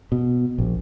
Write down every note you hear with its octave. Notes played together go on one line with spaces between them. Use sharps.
B2
A#1